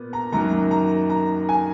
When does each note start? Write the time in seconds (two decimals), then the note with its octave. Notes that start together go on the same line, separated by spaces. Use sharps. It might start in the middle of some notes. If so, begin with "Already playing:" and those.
Already playing: A#2 B3
0.13 A#5
0.32 F#2 D#3 F#3 A#3 A#5
0.71 A#5
1.09 A#5
1.49 G#5